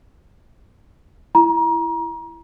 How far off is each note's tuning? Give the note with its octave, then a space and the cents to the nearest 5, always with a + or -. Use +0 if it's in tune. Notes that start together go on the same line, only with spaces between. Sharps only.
E4 +15 A#5 +30